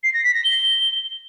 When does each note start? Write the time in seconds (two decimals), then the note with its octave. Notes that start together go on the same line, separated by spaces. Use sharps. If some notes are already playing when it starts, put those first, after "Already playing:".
0.03 C7
0.13 A#6
0.23 B6
0.34 A#6
0.44 G7